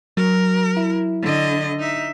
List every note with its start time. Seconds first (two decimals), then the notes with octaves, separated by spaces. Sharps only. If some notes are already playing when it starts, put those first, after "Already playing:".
0.17 F#3 A#4
0.77 E4
1.22 D3 D#5
1.79 D#4 E5